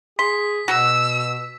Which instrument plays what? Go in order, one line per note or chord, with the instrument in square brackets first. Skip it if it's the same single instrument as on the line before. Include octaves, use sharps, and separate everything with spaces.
[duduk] G#4 [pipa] C6 [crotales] B6
[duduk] B2 [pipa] F#4 [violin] E6